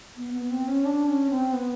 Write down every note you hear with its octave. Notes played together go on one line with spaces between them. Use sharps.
B3
B3
C4
C#4
D4
C#4
C4
B3